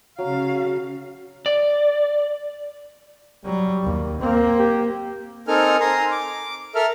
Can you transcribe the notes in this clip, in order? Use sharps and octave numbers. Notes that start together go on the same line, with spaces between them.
C#3 F#3 F5
D5
F#3 G3
D#2
A#3 C4
G4
C4 D#4 A4 A#4 G#5 F6
G#5 A#5 C6
D6
A4 A#4 E5 F6